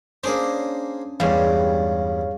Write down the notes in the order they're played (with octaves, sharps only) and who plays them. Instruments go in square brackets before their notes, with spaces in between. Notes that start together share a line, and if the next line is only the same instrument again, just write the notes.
[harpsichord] A#3 G#4 C5 [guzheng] C#4 D4
[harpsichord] E2 G2 [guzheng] G3 G#3 [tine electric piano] C#5 F5